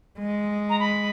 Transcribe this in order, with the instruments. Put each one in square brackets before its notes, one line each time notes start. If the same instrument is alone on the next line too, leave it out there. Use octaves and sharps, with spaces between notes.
[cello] G#3
[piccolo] A#5
B5